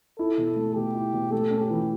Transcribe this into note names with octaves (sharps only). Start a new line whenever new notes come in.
E4 A4
B2
A3
B2 G4
E4
B2
A3 A4
C#4
G4
E3